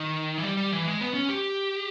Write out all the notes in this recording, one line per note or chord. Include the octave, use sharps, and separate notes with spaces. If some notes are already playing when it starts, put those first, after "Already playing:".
Already playing: D#3
E3
G3
G3
E3
G#3
B3
C#4
G4